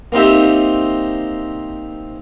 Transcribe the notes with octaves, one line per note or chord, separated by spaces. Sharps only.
A#3 C4 D#4 G4 E5